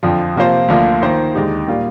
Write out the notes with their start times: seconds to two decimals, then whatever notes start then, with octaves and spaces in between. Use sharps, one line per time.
0.03 F2 D3 F3
0.36 C3 F3 A#3 F4 C5
0.68 D2 D3 F3 A#3
1.02 D#3 A#3 F4 C5
1.35 D#2 D3 G#3 D#4 G4
1.68 A#2 G3 A#3 F4